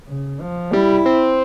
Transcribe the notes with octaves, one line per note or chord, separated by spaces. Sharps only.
C#3
F3
G3 E4
C4